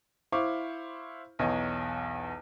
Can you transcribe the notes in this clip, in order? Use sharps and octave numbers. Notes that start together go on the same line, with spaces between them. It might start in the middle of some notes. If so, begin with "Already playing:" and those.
E4 C5 F5 C#6 D6
B1 E2 C#5 D#5